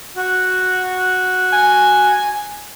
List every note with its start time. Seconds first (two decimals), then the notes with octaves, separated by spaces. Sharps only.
0.16 F#4
1.53 G#5